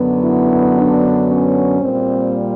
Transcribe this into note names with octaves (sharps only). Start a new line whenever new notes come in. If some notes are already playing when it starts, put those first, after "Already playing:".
Already playing: F#2 D3 F#3 B3
E4
D4
C#4
A#2 G3 A#3 C4